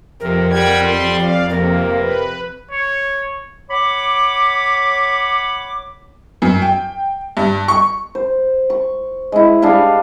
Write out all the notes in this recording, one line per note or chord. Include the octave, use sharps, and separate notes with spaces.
F2 C3 A#4
G3 F#5 G5 G#6
C6
D5 F5
C3 A#3 A#4
B4
C#5
C#5 F#5 B5 D6
F#2
G5
G2
C#6
C5
C#6
G#3 E4
G3 D4 G#4 F5